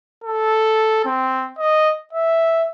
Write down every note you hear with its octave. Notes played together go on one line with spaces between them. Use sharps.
A4
C4
D#5
E5